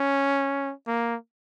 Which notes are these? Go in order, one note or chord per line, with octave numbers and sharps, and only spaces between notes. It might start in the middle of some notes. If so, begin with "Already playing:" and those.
Already playing: C#4
A#3